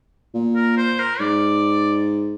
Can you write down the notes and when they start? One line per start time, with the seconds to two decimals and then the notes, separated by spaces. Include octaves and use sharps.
0.34 A#2
0.56 A#4
0.77 C5
0.99 A#4
1.20 G#2 D5